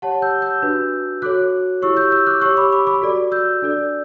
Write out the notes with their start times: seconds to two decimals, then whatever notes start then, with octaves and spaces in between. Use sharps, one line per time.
0.02 G4 C#5 F#5 A5
0.22 E6 G6
0.42 E6 G6
0.62 D4 F#4 B4
1.22 F#4 A4 C#5 D6 F#6
1.82 E4 G4 C#5 C#6 E6
1.97 E6 G6
2.12 E6 G6
2.27 D6 F#6
2.41 G4 C#5 C#6 E6
2.57 B5 D6
2.72 B5 D6
2.87 B5 D6
3.02 F#4 A4 D5
3.32 E6 G6
3.62 D4 A4 D5